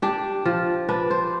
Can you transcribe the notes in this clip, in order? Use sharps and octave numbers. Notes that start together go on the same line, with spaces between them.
D4 G4
F3
D4 B4
C5